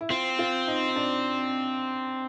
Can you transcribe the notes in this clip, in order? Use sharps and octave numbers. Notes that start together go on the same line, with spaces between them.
E4
C4 F4
F4
D#4
D#4
D4